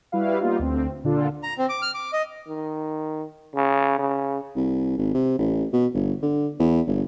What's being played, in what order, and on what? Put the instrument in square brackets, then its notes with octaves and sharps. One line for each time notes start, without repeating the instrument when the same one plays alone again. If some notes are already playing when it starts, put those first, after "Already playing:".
[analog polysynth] G3 E4 F#4 B4 F5
G3 A#3 B3 D#4 F4
D2 C4
A#2 D3 D4 F4 A4
[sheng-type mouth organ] A#5
C4
D6
F6
D6
D#5
[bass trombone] D#3
C#3
C#3
[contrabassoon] C2
G#1
C3
A1
B2
G1
D3
E2
G1